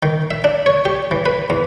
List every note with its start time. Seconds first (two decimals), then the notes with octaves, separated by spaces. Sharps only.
0.03 D#3
0.31 E5
0.44 D4
0.66 C#5
0.85 G4
1.11 E3
1.26 B4
1.50 E2